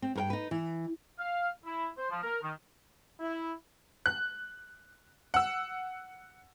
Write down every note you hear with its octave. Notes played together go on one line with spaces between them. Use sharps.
C4
G2 A#4 G5
D#4 B4
E3
F5
E4
C5
F3
A#4
D#3
E4
F#6
F#5 E6